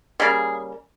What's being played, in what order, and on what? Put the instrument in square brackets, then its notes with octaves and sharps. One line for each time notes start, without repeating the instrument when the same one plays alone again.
[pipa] C#3 G3 A#3 G#4